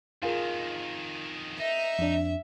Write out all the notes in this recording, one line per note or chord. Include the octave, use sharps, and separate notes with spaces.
F2 D#3 F4 G#4 A#4
D#4 E5
F2 D4